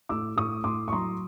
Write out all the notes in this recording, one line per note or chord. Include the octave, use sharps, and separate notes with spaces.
A2 D6 E6
A2 C#6 D#6
A2 C6 D6
C#6
F#3 A#5 C6